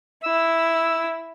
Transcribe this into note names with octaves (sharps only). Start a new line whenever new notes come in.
E4 E6